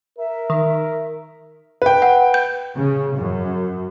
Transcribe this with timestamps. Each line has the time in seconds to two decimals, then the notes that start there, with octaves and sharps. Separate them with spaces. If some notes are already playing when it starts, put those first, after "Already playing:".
0.18 A#4 E5
0.50 D#3
1.82 B4 G5
2.02 F#5
2.34 G6
2.74 C#3
3.15 F#2